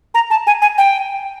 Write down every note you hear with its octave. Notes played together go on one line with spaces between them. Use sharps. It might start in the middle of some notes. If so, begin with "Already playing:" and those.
A#5
A5
G#5
G#5
G5